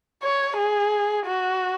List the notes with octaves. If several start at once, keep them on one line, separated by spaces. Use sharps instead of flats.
C#5
G#4
F#4